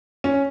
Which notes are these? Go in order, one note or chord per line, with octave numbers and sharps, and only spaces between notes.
C#4